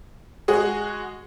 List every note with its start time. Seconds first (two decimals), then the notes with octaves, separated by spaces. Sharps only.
0.48 G#3 F#4 G#4